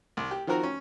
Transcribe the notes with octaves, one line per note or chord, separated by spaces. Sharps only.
C2
G4
D#3 F3 C4 F#4 A#4
C#4